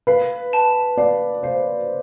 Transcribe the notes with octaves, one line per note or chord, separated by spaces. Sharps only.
B4 F5
A5
D5 F5
C5 F5